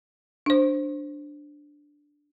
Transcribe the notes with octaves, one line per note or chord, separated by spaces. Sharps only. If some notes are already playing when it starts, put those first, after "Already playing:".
D4 C5